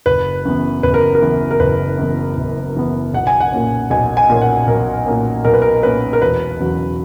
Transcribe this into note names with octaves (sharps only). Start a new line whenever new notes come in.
F#1 B4
F#2 E3 B3
F#1 B4
A#4
A#4
F#2 E3 B3
A#4
F#1 B4
F#2 E3 B3
F#1
F#2 E3 B3
B1 F#5
G#5
F#5
A#2 A#3 C#4
B1 G#5
G#5
A#2 A#3 C#4
F#5
B1 A#4
A#2 A#3 C#4
B1 A#4
B4
A#4
A#2 A#3 C#4 B4
A#4
E1 B4
E2 C#3 F#3